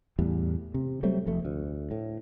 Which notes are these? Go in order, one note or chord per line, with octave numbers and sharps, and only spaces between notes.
E2 A2 G3
C3
F#3 G3 A3 C4
F1 F2 A3
D2
A2